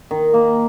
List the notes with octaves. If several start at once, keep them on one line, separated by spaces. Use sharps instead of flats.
D#3
A#3